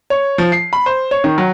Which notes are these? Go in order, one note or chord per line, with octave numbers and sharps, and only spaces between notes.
C#5
F3
C7
B5
C5
C#5
D#3
F#3